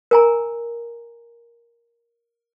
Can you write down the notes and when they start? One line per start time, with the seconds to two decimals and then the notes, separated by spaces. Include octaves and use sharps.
0.11 A#4 G#5 A#5